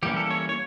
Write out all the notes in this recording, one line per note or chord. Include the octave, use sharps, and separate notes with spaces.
E3 G3 A#3 C#4 G4
A4
C#5
C#5